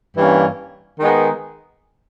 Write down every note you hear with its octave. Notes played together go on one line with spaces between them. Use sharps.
G2 E3 G3 A#3 C#4
D#3 G#3 B3 D#4